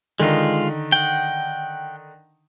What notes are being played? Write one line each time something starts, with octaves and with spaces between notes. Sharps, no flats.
D3 D#3 G#3 D#4 F4
F#5 G5